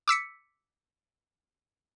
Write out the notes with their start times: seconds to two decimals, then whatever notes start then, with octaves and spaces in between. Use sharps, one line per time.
0.08 D6 E6 B6 C#7